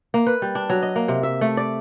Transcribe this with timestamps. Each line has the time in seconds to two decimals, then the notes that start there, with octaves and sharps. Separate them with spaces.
0.14 A#3
0.27 B4
0.42 G3
0.55 D4
0.70 F#3
0.83 D#5
0.96 A#3
1.08 C3
1.23 E5
1.41 A3
1.57 D5